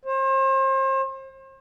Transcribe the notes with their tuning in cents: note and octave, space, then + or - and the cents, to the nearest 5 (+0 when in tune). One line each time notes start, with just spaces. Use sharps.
C5 +35